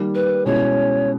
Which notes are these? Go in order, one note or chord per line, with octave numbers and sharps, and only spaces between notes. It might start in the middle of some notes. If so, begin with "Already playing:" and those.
Already playing: D#3 G3 A#3
B4
B2 G#3 C#4 E4 C#5